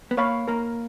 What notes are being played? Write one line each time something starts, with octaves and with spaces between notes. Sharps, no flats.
B3
A#3 C#5 F5 B5
A#3 A#4